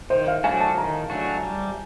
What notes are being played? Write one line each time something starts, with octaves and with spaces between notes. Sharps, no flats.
D#3 C5
F5
F#3 A3 D4 F#4 G#5
A5
D#3 A#5
F#3 A3 D4 F#4
G3